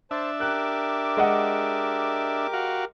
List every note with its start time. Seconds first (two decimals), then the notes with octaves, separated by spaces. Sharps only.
0.11 D4 C5 E5 A5
0.40 G4 A#4 D6 F#6
1.17 G#3 D#5 F#5
2.53 F#4 F5